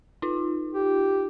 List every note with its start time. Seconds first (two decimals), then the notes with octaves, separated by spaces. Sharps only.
0.22 D#4 F4
0.74 G4